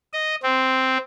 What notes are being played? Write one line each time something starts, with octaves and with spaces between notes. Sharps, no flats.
D#5
C4